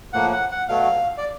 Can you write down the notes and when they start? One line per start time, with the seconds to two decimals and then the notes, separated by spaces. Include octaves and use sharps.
0.13 A2 F3 A#3 F#5
0.32 F#5
0.51 F#5
0.69 B2 F#3 A3 F5
1.18 D5